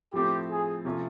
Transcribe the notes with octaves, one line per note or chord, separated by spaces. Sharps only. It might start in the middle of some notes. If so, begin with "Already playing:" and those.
A2 F3 A3 C4 G4
G#4
C3 F3 A3 C#4 F4